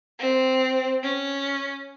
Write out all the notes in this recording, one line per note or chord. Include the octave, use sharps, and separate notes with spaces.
C4
C#4